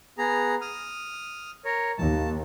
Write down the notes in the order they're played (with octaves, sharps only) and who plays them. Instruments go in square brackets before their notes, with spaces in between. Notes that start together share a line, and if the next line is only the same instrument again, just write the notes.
[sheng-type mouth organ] B3 G#4 A#5
D#6 F6
A#4 C#5
[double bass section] D#2 [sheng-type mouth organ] A5